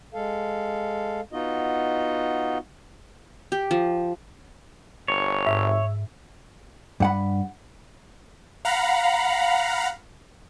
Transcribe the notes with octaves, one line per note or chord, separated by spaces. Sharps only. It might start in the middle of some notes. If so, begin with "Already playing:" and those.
G#3 A4 F5
B3 D#4 F4 F#4 D#5
G4
F3
G1 C#5
G#2 E5
G2 F#5 B5
F5 F#5 A#5 B5